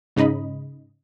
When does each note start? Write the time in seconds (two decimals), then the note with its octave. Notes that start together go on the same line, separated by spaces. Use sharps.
0.16 G#2 C#3 D#4 D#5 B5